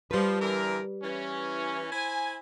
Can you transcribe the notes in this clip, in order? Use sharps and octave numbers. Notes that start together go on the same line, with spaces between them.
F3 G3 B4
D3 E3 A#4
E3 C#4
E4 C5 G#5